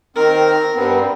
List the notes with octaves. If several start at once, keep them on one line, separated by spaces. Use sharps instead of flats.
D#3 C4 A#4
G2 B3 C4